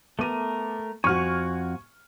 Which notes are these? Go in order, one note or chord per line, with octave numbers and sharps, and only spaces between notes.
A3 B3 A#4 D6 D#7
F2 F#4 G#5 C#6 F6